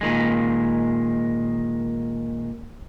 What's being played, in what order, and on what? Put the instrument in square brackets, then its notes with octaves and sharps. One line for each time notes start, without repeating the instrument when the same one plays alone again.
[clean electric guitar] A#2 D#3 G#3